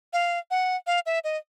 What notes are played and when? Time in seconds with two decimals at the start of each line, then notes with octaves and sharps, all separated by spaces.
0.13 F5
0.51 F#5
0.87 F5
1.06 E5
1.24 D#5